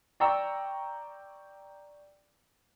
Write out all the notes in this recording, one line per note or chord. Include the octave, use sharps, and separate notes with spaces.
D5 G5 A#5 C#6 E6